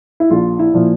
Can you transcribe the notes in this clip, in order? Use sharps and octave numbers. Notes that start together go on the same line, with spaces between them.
E4
A#1 F4
E4
A#2 F3